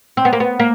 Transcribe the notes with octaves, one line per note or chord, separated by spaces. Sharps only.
C4
B3
A#3
B3
A#3